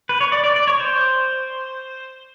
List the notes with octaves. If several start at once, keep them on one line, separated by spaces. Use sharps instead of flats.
B4
C#5
D5
D5
D5
C#5
C5